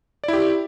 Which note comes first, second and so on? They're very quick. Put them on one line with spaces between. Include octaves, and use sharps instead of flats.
D5 E4 G4